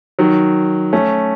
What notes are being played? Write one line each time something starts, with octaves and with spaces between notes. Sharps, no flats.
D#3 F#3
A3 C#4